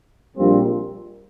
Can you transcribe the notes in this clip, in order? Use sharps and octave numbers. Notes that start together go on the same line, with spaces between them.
A#1 A#2 G3 C4